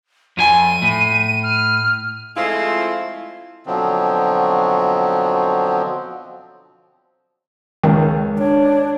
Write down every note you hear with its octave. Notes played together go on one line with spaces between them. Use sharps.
F2 F4 G#5 D#7
A2
F6
F3 G#3 A3 C4 E4 F4
B2 D3 F3 F#3 C4
C#2 D#3
D4 C#5